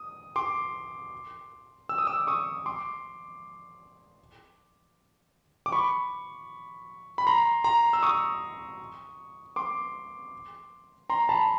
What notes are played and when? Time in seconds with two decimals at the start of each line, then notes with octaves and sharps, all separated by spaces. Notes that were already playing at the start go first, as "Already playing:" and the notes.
Already playing: D#6
0.36 C6 D6
1.89 E6
1.98 D#6
2.07 D6 E6
2.27 C#6 D#6
2.66 C6 D6
5.66 D6
5.72 B5 C#6
7.18 B5
7.27 A#5 C6
7.64 A#5 C6
7.93 E6
8.03 C#6 D#6
9.56 C6 D6
11.10 A#5 C6
11.29 A5 B5